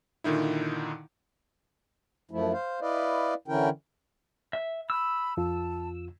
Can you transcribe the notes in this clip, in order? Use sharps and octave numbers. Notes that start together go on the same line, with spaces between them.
A#2 D3 D#3 D#4 E4
F#2 F3 A3 E4
C5 F5
E4 B4 D5 D#5 F5
D3 E3 C#4 E4 A#4 G5
E5
B5 E6
F2 F4 A5